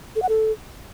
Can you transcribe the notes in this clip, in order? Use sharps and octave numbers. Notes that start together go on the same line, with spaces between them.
A4
F#5
A4